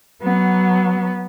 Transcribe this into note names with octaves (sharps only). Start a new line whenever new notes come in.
F#3 B3